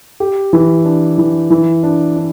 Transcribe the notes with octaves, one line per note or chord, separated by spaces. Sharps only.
G4
E3
D4
E3
E3
D4
D4